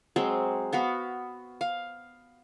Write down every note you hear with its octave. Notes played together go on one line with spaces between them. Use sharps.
F#3 G#3 C4
B3 F#4 F5
F5